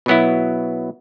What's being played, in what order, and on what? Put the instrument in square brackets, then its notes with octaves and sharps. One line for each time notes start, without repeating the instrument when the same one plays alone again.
[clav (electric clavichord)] B2 F#3 B3 E4